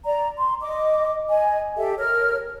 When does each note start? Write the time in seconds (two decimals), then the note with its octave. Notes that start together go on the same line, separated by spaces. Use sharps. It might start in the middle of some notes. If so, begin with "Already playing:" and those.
0.04 D5 A#5
0.37 C6
0.62 D#5 D6
1.29 D#5 G#5
1.76 G4 A4 E5
1.98 A#4 C#5 F6